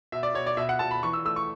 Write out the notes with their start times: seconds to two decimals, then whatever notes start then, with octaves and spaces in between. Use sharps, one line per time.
0.12 B2 E5
0.23 D5
0.34 B2 C#5
0.46 D5
0.57 B2 E5
0.69 F#5
0.79 B2 A5
0.91 B5
1.03 E3 C#6
1.13 E6
1.25 A3 E6
1.36 C#6